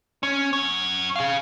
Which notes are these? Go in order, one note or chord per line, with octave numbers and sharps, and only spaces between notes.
C#4
F#2 C#5
G#4 F5